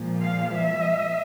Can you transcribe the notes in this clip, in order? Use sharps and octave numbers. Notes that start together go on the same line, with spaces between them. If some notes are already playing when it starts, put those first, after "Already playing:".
Already playing: A#2 F3 G#3
F5
E5